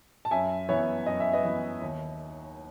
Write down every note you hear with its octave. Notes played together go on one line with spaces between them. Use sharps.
A5
F#2 E5 G#5
E3 B3 C#5 E5
F#2 D#5
E5
B4 D#5
E3 B3
D#2